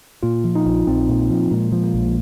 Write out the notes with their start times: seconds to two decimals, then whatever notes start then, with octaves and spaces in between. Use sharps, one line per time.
0.23 A#2 F4
0.44 F3
0.55 D#4
0.66 A#1
0.87 A#1 C4
1.09 A#2
1.30 F3
1.51 A#2 G#3
1.72 F3
1.84 A#3
1.94 A#1